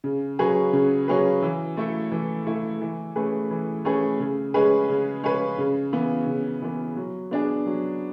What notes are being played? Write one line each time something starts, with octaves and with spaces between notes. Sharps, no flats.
C#3
F#3 C#4 G#4 B4
C#3
F#3 C#4 G#4 B4
E3
A3 E4 A4
E3
A3 E4 A4
E3
A3 C#4 G#4 B4
E3
A3 C#4 G#4 B4
C#3
G#3 C#4 G#4 B4
C#3
G#3 C#4 G#4 B4
C#3
E3 B3
C#3
E3 B3
F#3
B3 D4 G#4
F#3